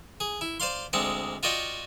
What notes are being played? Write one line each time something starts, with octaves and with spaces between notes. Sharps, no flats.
G#4
E4
C5 D5 F5 C6
D2 G#3 C4 D5 F#5
F4 F#4 D5 D#5 F#5 G5